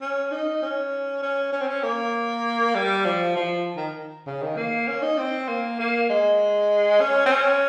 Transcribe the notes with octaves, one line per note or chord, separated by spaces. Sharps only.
C#4
D#4
C#4
C#4
C#4
C4
C#4
A#3
G3
F3
F3
D#3
C#3
D#3
A#3
C#4
D#4
C4
A#3
A#3
G#3
C#4
C4
C#4